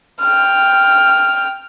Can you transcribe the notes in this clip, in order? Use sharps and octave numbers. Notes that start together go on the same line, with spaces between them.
G5 F6